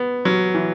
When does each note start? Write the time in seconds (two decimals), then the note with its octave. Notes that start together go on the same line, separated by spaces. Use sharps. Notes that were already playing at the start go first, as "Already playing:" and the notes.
Already playing: B3
0.25 F#3
0.55 E3